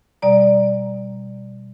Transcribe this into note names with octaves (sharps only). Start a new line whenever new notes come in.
B2 G3 D5 A#5